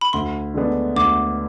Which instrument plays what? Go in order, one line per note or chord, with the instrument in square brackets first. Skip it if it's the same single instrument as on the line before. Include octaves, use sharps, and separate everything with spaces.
[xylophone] B5
[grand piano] D2 [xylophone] C6
[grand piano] D3 G#3 B3 D4
[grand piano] D2 [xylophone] D6